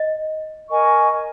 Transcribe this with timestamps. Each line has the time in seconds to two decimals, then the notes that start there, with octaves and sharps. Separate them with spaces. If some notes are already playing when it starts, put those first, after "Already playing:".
Already playing: D#5
0.70 A#4 D#5 G#5 C#6